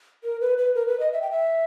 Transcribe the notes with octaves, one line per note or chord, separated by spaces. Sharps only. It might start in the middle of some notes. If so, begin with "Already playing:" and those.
A#4
B4
B4
A#4
B4
D#5
E5
G5
E5